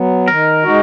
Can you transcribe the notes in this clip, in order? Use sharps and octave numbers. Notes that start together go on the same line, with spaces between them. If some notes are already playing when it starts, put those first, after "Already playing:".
Already playing: F#3 B3
D#3 A#4
G#3 D#4 F#4